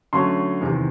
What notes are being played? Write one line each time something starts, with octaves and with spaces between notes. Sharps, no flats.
D3 F#3 A3 C#4 C6
E2 C3 D#3